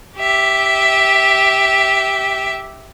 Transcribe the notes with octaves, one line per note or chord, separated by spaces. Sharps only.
G4 E5